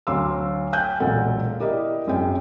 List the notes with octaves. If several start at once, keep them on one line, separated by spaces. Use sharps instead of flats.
D2 F#3 F5 C6 D6 E6
G5 G#5 F#6 G6
E1 B1 A#2 A4 F#5
E4 G4 A#4 D5 D#5
G#1 F#2 G#4 G5